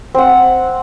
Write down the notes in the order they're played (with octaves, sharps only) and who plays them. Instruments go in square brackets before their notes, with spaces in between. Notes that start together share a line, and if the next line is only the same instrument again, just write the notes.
[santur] C4 F#5